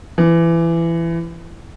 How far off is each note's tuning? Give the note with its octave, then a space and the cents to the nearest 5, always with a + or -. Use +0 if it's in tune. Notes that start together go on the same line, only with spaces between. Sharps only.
E3 +20